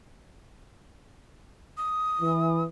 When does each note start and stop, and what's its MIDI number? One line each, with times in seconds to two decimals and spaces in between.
1.77 2.63 87
2.21 2.64 52